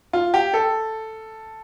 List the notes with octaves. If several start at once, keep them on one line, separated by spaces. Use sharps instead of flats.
F4
G4
A4